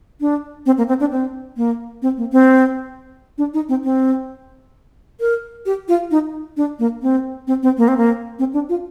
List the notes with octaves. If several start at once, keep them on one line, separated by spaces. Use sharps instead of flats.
D4
C4
A#3
C4
D4
C4
A#3
C4
A#3
C4
D4
D#4
C4
C4
A#4
G4
F4
D#4
D4
A#3
C4
C4
C4
A#3
C4
A#3
C4
D4
F4